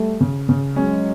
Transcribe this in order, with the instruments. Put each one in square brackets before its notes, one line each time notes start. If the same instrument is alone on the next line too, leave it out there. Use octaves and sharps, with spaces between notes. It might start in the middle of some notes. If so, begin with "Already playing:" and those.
Already playing: [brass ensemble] G3 A3
[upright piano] C#3
C#3
[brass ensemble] F#3 G#3 [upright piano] C#4